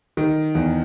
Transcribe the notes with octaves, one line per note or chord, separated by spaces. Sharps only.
D#3
E2